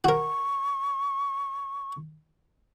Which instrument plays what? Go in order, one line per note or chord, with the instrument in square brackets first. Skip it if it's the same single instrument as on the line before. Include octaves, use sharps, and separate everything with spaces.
[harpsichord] F#4 A#4 [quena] C#6